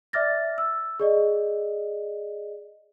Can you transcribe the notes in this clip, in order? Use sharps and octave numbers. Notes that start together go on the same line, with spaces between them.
D5 E5 D6 F6 A6 A#6
E6
G#4 D5 D#5